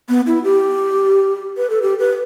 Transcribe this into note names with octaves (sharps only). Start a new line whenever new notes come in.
B3
E4
G4
B4
A4
G4
B4